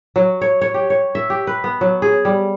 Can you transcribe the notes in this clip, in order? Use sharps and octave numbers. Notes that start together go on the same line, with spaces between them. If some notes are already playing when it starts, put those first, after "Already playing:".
F#3
C#5
C#5
G4
C#5
E5
G4
B4
B3
F#3
G#4
G3